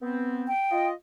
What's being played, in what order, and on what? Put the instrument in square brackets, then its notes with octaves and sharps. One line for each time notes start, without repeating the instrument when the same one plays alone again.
[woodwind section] B3 C4
[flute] G5
[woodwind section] F4 D#5